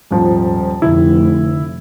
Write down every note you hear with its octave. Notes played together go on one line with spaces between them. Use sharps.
D#1 G#2 F3
F1 D3 E4